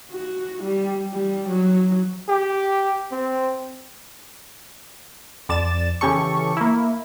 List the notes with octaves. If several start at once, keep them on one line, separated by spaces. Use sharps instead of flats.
F#4
G3
G3
F#3
G4
C4
F2 D5 A6 E7
C#3 E3 C#4 G4 A4 C#6
A#3 E4